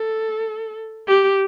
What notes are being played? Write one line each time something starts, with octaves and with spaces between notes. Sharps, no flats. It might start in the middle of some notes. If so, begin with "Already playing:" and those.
Already playing: A4
G4